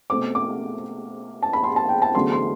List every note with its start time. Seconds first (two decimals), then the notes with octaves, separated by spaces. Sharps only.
0.10 B2 A3 C4 D6
0.35 D6
1.42 A5
1.53 B5
1.64 C6
1.76 A5
1.89 G5
2.02 A5
2.15 E2 D3 F#3 A3 C6
2.32 C6